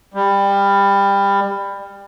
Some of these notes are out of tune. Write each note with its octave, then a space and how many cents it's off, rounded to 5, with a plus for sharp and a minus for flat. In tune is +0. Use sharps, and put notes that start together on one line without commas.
G3 +20